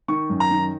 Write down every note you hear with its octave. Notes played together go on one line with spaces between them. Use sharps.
D#3 C#6
F#2
A#5
D#3